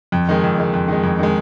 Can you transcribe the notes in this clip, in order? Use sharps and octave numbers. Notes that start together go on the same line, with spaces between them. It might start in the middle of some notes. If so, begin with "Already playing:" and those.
F2
D#3 G#3
F2
D#3 G#3
F2
D#3 G#3
F2
D#3 G#3